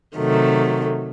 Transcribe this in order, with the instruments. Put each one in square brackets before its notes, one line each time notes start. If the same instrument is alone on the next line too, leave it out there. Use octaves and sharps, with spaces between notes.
[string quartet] C3 D#3 F#3 A3